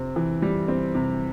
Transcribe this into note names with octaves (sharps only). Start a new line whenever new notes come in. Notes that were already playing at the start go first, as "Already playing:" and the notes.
Already playing: C3 C4
E3
G3
C4
C3